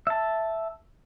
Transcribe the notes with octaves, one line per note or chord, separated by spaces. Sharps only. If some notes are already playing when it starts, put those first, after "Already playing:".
E5 A5